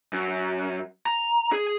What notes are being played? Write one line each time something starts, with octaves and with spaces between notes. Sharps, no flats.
F#2
A#5
G#4